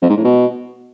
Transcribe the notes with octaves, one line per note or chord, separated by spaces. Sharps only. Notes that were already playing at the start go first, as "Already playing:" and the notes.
F2
G#2
A2
B2